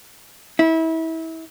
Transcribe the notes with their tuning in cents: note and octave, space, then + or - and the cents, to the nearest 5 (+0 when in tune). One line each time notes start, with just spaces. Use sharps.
E4 -30